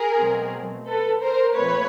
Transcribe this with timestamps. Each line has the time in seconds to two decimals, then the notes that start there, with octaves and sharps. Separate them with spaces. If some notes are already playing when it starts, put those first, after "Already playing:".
Already playing: G#4 A#4
0.19 B2 F#3 A3 C4
0.86 A4 B4
1.20 A#4 C5
1.54 A#2 F3 A3 C4 B4 C#5